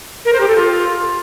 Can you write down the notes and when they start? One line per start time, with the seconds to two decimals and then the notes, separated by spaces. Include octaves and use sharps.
0.25 A#4
0.32 C5
0.40 G4
0.48 A4
0.55 F4